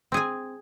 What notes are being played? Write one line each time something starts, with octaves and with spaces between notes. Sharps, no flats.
C4 G#4 G#5